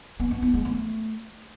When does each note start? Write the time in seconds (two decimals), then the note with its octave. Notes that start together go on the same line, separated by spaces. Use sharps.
0.20 B3
0.31 B3
0.42 E4
0.54 G#3
0.65 A3